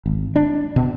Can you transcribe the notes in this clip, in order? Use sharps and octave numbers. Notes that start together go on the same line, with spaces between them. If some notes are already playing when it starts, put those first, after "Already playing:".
G#1
D4
B2